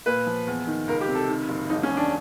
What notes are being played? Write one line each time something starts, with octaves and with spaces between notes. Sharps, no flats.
A#2 B4
F3
E2
D#3
C#2 A#4
G4
C3
A4
D#3
F#1
E1 D#4
C#4
E1
D4